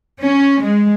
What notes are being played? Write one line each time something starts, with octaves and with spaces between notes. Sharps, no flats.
C#4
G#3